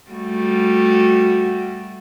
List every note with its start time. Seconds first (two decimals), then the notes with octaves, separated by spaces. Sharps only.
0.12 G3 A3 F#4